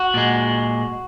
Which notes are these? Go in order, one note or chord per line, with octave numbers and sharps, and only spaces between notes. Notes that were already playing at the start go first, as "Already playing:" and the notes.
Already playing: F#4
A#2 G#3